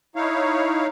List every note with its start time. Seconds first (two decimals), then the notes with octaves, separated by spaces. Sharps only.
0.16 D#4 E4 C#5 F5